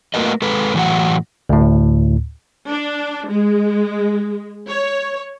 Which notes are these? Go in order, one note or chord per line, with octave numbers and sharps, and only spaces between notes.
A3 A#3 F#4 A#4 B4 D#5
G#3 A4 B4
A2 E3 F#3 F#5
D2 A2
D4
G#3
C#5